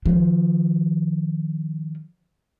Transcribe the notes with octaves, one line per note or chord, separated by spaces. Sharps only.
D#3 F3